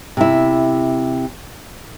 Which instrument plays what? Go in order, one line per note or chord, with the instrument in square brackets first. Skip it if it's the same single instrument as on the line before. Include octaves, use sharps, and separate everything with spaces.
[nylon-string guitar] C3 E4